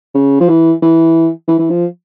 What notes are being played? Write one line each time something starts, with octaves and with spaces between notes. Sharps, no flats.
C#3
F3
E3
E3
E3
E3
F3